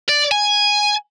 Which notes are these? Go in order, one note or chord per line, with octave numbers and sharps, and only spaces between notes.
D5
G#5